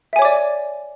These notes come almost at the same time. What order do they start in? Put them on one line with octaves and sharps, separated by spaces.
E5 G#5 C#5 D6 D5